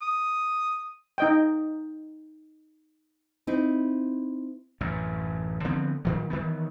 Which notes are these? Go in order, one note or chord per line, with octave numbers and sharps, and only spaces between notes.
D#6
D#4 D#5 G5
C4 D#4 E4
A1 F#2
D3 F3 B3 C4
A#2 D#3 F#3
D#3 E3 B3